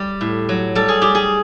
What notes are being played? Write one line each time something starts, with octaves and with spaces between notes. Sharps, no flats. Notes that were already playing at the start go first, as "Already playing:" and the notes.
Already playing: G3 G4
A2
F#3
G3 A4
G#4
G3 G4
G#4